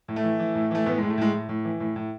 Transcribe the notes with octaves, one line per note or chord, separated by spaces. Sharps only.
A2
A3
E3
E3
A2
E3 A3
A2 B3
G#3
A2
A3
A2 G#3
A2
A2
E3
A2
A2